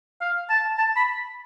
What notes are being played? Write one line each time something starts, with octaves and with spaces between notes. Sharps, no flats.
F5
A5
A5
B5